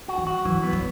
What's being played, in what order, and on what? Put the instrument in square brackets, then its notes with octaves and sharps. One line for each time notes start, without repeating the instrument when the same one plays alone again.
[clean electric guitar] F#4
[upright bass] E3
[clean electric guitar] F#4
[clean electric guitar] E3 [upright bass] F#3
[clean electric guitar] B3
[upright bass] F#3